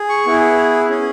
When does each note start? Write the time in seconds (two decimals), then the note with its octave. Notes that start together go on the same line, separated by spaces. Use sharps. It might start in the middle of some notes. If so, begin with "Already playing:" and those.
Already playing: G#4
0.09 C#6
0.26 B3 E4 G#4
0.89 C#4 G#4